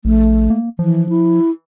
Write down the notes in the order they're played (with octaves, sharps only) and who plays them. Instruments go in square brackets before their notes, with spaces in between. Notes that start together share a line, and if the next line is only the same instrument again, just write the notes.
[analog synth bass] A#1 [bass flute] A3
[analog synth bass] A#3
[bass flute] E3 [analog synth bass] F3
[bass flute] E4